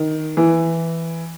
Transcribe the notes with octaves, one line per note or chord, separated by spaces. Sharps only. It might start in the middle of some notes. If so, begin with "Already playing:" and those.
Already playing: D#3
E3